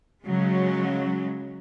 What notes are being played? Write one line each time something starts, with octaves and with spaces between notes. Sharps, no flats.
C#3 F#3 G#3